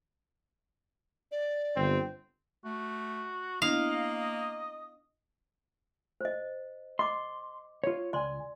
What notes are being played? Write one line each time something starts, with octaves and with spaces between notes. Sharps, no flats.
D5
G1 C4
A3 F#4
A#3 B3 D4 E4 D#5 F5
C5 D#5
D#5 C6 D6
F4 C#5
C#2 D5 G#5 C6